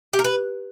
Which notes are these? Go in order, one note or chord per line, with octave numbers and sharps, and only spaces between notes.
G4
A#4
B4